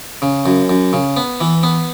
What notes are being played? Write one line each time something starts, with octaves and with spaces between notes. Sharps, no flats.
C#3
F#2
F#2
C#3
B3
E3
B3